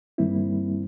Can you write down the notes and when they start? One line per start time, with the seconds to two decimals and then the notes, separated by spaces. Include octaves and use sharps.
0.18 G2 D#3 G3 A#3 C4 E4